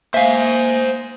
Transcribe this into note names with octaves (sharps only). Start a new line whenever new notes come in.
A#3 C5 E5 F5 G#5